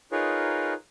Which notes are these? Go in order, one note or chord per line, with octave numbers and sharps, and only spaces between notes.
D#4 F4 G#4 A#4 B4 C#5